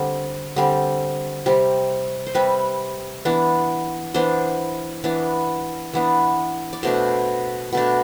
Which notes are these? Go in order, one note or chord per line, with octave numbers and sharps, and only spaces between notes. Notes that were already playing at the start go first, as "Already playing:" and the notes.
Already playing: D3 G3 C4
D3 G3 C4
C3 G3 C4
C5
C3 G3 C4 B4
E3 B3 D4
E3 B3 D4 C5
E3 B3 D4
E3 B3 D4
D5
B2 A3 D4 C5
B2 A3 D4